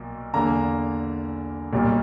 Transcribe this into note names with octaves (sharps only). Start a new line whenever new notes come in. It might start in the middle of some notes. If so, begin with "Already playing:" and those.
Already playing: B1 A#2 A#3
E2 D3 A#3 A#5
B1 A#2 G3 A#3